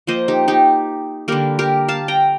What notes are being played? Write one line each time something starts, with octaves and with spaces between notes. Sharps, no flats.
F3 A#3 C5 D#5
D#4 G4
D#4 G4
D3 G3 A#3 G4 A#4
G4 A#4
F5 A5
G5 A#5